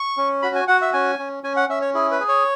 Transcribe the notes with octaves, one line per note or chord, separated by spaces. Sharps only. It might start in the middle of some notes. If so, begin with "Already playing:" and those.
Already playing: C#6
C#4
F#4 B5
G#5
F#4 F#5
E5
C#4 G#5
C#4
C#4 G#5
F#5
C#4 E5
C#5
E4 G#4
B4
G#4
C#5